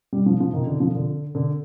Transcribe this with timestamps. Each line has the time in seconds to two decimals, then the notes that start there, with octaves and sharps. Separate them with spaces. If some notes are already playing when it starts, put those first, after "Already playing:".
0.13 G3
0.26 F3
0.40 F3
0.53 D#3
0.67 D3
0.80 F3
0.94 D3
1.35 D3